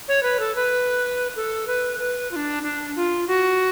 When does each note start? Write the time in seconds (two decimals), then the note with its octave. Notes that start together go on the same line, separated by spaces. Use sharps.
0.08 C#5
0.23 B4
0.40 A4
0.56 B4
1.36 A4
1.67 B4
1.99 B4
2.31 F4
2.36 D4
2.63 D4
2.96 F4
3.28 F#4